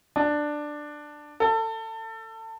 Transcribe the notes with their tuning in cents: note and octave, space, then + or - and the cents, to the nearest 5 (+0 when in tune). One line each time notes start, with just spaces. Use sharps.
D4 +10
A4 +25